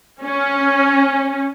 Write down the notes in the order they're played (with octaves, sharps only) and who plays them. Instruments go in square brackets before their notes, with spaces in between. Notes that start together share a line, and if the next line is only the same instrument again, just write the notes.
[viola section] C#4